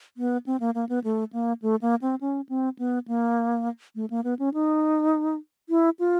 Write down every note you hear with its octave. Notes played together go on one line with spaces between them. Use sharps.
B3
C4
A#3
A#3
B3
A3
A#3
A3
A#3
C4
C#4
C4
B3
A#3
A3
A#3
B3
C#4
D#4
E4
F4